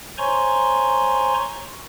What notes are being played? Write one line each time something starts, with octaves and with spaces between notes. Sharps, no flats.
C5 C#5 G#5 A#5 C6 C#6